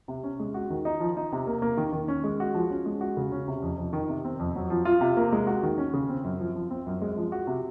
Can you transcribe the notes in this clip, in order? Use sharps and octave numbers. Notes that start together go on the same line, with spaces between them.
C3
C#4
G#3
F#4
D#3
D#4
F3
D#4
C3
A#3
A#3
D#3
D#3
C#4
G#3
F#4
F3
C#4
G#3
F#4
C#3
C#4
C3
F2
F2
D#3
C3
C4
F2
F#3
F3
F4
C3
A#3
G#3
F#4
D#3
C#4
C#3
C4
F#2
F3
F3
C4
F#2
G#3
F3
F#4
C3